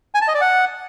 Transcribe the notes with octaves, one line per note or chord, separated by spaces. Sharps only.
G#5
A5
D#5
D5
F#5